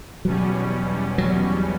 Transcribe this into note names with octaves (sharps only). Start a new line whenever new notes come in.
E2 B2 F#3 G3 C#4
F#3